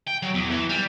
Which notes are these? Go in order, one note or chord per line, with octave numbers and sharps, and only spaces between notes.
G5
F#3
E2
E3
G3